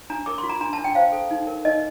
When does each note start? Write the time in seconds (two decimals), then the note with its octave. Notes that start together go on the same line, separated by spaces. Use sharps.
0.10 D4 A#5
0.26 A#4 D6
0.38 C6
0.43 F4
0.50 A#5
0.61 D4 A#5
0.73 A5
0.78 D4
0.84 G5
0.95 C5 F5
1.12 A4
1.31 D#4
1.47 A#4
1.65 D#4 D#5